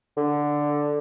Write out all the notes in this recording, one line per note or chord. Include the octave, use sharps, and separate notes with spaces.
D3